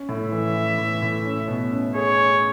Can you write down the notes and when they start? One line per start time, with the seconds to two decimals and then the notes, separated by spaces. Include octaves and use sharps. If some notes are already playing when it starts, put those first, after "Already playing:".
Already playing: C#4
0.09 A2
0.20 E5
0.32 E3
0.55 E3
0.78 A2
1.02 A2
1.25 C#4
1.48 B2
1.72 C#4
1.95 G#4 C#5
2.18 C#4